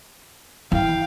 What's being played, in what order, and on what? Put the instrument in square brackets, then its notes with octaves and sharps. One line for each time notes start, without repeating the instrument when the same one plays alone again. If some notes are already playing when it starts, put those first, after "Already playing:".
[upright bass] E3 [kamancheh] F5 G5